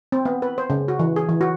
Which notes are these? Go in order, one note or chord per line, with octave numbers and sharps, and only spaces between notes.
C4
B3
B4
C5
C#3
F#4
E3
G#4
E3
F#4